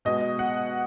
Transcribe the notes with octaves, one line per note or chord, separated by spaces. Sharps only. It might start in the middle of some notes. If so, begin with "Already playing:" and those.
B2 G#3 B3 D#5
F#5